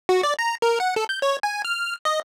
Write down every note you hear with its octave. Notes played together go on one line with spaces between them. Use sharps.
F#4
D5
A#5
A#4
F#5
A4
G6
C#5
G#5
F6
D#5